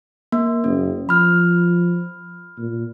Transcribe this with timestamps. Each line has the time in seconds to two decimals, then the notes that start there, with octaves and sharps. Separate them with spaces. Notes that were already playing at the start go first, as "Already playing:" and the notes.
0.32 A#3
0.64 F#1 C#4
1.09 F3 B5 F6
2.58 A#2